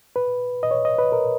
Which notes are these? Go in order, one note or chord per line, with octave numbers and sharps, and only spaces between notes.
B4
D#5
C#5
D#5
B4
A#4